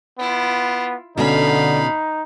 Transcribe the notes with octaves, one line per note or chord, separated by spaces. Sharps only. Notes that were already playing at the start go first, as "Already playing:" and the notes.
B3 E4 F4
B2 D3 C#4 D#4 F5 B5